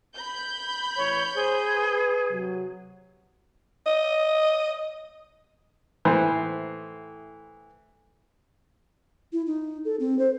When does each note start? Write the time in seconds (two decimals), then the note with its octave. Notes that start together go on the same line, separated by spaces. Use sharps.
0.15 B5 G6
0.97 A1 C#5
1.35 G#4 C5
1.74 B4
2.30 C3 F#3
3.86 D#5
6.05 A2 E3 C5
9.33 E4
9.47 D#4
9.85 A4
10.00 C4
10.19 C5